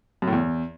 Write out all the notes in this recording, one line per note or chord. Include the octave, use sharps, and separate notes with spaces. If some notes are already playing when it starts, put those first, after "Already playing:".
F#2
A2
E2